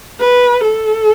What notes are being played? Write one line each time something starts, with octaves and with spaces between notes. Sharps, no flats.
B4
A4